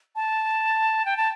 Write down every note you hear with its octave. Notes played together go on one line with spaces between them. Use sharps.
A5
G5
A5